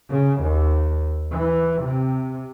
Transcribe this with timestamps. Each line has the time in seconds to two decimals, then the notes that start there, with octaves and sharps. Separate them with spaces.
0.11 C#3
0.43 D#2
1.31 E3
1.82 C3